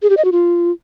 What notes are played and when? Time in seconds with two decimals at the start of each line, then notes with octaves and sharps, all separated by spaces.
0.02 G#4
0.10 G4
0.17 D#5
0.25 F#4
0.32 F4